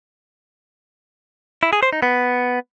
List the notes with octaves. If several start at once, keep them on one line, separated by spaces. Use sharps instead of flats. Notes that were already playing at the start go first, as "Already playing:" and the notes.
E4
G#4
C5
D#4
B3